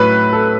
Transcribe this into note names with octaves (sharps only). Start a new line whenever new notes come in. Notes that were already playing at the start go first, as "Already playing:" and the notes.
Already playing: A2 F#3 E4 B4
A4